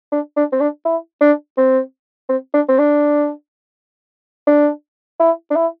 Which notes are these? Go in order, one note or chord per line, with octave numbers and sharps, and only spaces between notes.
D4
D4
C4
D4
E4
D4
C4
C4
D4
C4
D4
D4
E4
D4
E4